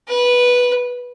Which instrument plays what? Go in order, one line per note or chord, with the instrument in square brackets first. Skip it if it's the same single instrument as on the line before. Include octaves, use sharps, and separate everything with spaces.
[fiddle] B4